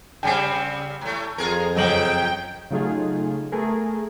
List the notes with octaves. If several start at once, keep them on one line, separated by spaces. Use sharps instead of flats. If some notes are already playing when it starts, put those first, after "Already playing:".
C#3 G3 C4 G5 G#5 C7
A2 A3
F2 F4 G#4 A#4
F#2 C#3 F3 D#5 G5 F#7
C#3 F#3 A3 D#4 F4 G#4
A3 B3 G#4 A#4